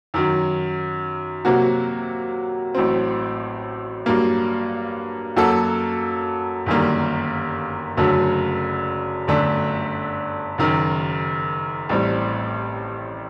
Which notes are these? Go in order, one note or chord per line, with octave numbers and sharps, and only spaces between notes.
F#2 D#3 F#3
C3 F#3 A#3 F#4
A1 A2 F#3 C4
G2 F#3 A#3
F#2 F#3 A#3 F#4 A4
G1 F#2 D#3 G3 A#3
F#1 F#2 D3 F#3 A3
G1 F#2 D3 A3 D4
F#1 F#2 D#3
A1 A2 G3 C4